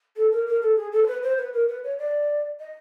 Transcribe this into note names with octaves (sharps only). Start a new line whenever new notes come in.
A4
A#4
A#4
A4
G#4
A4
C5
B4
C5
B4
A#4
B4
C#5
D5
D#5